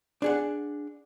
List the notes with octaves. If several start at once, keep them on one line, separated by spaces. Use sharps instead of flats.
D4 G#4 F#5